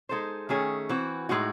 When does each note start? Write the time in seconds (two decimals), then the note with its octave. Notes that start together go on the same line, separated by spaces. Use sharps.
0.09 G#3 D#4 A4 C5
0.49 D#3 A3 C#4 G#4
0.89 E3 C4 F#4
1.29 A2 G#3 D#4 F#4